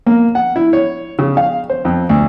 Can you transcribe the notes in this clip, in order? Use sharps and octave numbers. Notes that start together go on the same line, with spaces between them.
A#3
F#5
E4
C#5
C#3
F5
C5
F2
D2